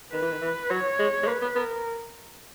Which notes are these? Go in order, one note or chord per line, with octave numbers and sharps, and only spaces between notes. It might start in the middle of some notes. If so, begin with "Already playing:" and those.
D#3 B4
E3
D#3
E3
F#3 C#5
G#3
G#3
A#3 B4
B3
B3 A#4